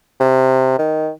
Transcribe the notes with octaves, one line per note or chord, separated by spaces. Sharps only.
C3
D#3